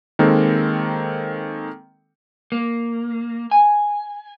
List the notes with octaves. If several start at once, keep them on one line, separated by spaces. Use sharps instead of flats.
D#3 G#3 A#3 C4 A4
A#3
G#5